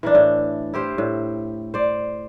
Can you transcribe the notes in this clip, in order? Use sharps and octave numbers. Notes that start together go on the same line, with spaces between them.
E3 A#3 D4
A2
E4 G4 C5 F5
A2
C5 D5